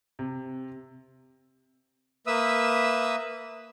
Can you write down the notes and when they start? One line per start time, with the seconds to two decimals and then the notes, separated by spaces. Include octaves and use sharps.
0.19 C3
2.27 A#3 B4 E5 D#6 E6